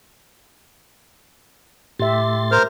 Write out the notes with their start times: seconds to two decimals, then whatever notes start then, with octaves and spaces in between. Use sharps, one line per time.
1.99 A2 G4 E5 C6 A6
2.51 A#4 C5 F6